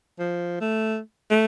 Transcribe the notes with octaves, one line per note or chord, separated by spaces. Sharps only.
F3
A3
A3